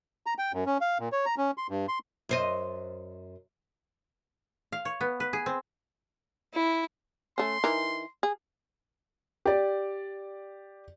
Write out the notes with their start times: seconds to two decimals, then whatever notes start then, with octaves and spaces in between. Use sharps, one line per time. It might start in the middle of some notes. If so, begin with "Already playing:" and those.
0.26 A#5
0.39 G5
0.53 F#2
0.66 C#4
0.81 F5
1.00 A#2
1.12 C#5
1.26 A#5
1.38 C#4
1.58 C6
1.69 G2
1.88 C6
2.29 F#2 C5 D#5
4.72 F5
4.85 C#5
5.01 B3
5.20 B4
5.33 G#4
5.46 C4
6.54 E4
7.38 A3 C#4 C6
7.64 E3 D#4 A#4
8.23 G#4
9.45 G4 D5